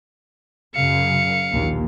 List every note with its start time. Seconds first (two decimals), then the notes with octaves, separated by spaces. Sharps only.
0.75 F#2 C#3 F5 C#7
1.52 A#1 D#2